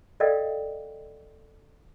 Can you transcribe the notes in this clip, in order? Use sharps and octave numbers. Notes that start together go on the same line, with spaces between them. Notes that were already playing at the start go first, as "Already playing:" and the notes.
A4 A#4 D5 D#5 F5 G5